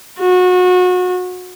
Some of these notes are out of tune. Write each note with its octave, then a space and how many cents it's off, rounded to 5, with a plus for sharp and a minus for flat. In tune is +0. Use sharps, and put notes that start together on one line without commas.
F#4 -30